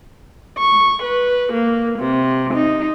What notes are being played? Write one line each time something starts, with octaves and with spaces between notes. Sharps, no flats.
C#6
B4
A#3
C3
D#4